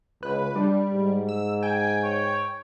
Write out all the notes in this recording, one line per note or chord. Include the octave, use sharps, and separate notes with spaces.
C#2 B4
G3 D4
G#2
E6
G5 G#5
C#5